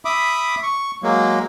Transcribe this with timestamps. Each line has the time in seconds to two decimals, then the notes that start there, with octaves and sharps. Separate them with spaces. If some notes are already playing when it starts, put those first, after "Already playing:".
0.05 E5 B5 D6 D#6
0.63 C#6
1.03 F#3 G#3 A#3